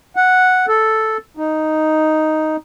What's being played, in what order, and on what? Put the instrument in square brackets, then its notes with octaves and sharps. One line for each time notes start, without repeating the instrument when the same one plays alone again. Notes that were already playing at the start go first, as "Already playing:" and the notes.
[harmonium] F#5
A4
D#4